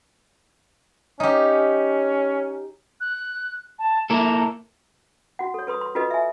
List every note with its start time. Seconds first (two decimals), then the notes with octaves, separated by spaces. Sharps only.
1.20 C#4 D#4 G4
3.01 F#6
3.79 A5
4.10 A#3 E4 A4 A#5
5.39 F#4 F#5
5.54 A4 C#5
5.67 A4 B4 C6 D#6
5.81 C6
5.95 F4 F#4 A4 B4 D#5
6.11 E5 G#5